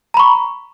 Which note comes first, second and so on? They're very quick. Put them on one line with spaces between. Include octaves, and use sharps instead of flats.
A#5 B5 C#6